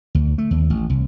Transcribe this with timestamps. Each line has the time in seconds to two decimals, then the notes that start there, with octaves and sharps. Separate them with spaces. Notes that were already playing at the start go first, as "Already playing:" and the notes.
0.15 D2
0.38 A3
0.51 D#2
0.70 A1
0.90 C2